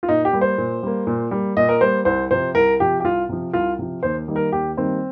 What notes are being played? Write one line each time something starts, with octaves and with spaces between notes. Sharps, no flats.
F4
A#2 D#4
G4
G3 A#3
C5
A#2
G3 A#3
A#2
G3 A#3
A#2 D#5
A#4
G3 A#3 C5
C2 C5
C3 F3 C5
C2 A#4
C3 F3 G4
G4
C2 F4
C3 F3
C2 F4
C3 F3
D#2 C5
D#3 G3 A#3
A#4
D#2 G4
D#3 G3 A#3 C4